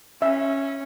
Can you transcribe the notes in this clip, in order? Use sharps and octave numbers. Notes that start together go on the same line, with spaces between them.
C#4 E5